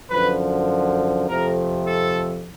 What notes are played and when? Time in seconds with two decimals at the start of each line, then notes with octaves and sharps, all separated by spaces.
0.10 F#2 D3 F3 B4
1.28 F2 C3 F3 A3 A#4
1.87 A4